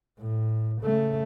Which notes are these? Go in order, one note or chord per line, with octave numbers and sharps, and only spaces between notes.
A2
C#3 A3